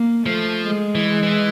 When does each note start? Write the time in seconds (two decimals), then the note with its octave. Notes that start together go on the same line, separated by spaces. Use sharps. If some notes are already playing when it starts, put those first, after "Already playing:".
Already playing: A#3
0.26 F3 A3
0.67 G#3
0.95 E3
1.23 E3